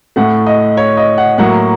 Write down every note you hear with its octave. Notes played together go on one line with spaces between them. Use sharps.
A2 A3 F#5
D#5
C#5
D#5
F#5
A2 F#3 A#3 F#5